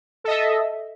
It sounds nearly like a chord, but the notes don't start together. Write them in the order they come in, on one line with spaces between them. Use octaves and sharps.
A4 D#5 E5